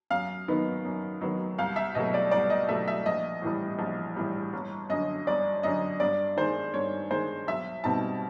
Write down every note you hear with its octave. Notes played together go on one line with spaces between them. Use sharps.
F#2 F5
D#3 F#3 B3 D#4
F#2
D#3 F#3 B3 D#4
C2 F5
E5
B2 F#3 A3 D#5
D5
C2 D5
D#5
B2 F#3 A3 E5
E5
A#1 D#5
A2 E3 G3
A#1
A2 E3 G3
G1
F#2 D3 D#5
G1 D5
F#2 D3 D#5
G2 D5
D#3 G#3 C5
G2 C#5
D#3 G#3 C5
B1 E5
B2 G3 C4 D#4 A5